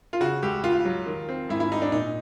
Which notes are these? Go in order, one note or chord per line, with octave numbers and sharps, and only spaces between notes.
F4
C#3 F#4
C#2 G4
C#2 F4
F#3
D#3
C4
G#2 E4
E4
G3 D#4
D4
A#2 D#4